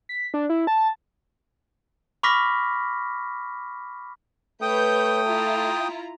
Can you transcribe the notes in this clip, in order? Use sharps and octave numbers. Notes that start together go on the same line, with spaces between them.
B6
D4
E4
A5
B5 C#6 D6 F6 A#6 B6
A3 B4 C#5 G5 D#6 G6
E4 F4 A#5